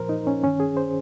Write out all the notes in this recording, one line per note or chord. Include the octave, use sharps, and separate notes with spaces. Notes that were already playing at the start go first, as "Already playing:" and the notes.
Already playing: A#2 F3 A#4 C5
D#4
C#4
G2 D#3 C#4
G#4
C5